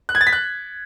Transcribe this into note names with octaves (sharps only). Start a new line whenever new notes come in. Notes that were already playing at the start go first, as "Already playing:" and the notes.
F#6
G#6
A6
B6
F#6